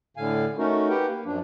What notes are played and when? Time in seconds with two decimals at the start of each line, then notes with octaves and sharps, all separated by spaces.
0.17 A2 D3 F5 G#5
0.58 A3 C#4 D#4 F#4 A#4
0.89 G4 A#4 B4 F#5 G5
1.06 A#3
1.25 F#2 F3 D4